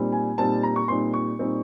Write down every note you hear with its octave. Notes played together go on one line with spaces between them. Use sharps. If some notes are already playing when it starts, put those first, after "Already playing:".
Already playing: A#2 G3 C4 D#4
G#5
A#2 G3 C4 D#4 A5
A#5
C#6
A#2 G3 C4 D#4 C6
C#6
A#2 G3 C4 D#4